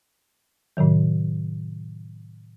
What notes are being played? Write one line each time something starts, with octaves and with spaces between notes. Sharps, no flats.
A2 C3 D#3 F#3